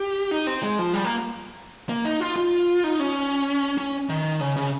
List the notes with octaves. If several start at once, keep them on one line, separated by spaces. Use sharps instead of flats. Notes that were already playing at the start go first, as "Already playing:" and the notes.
Already playing: G4
D#4
C4
G#3
F3
G3
A#3
A#3
D#4
F4
F4
D#4
C#4
C#4
D#3
C#3
C#3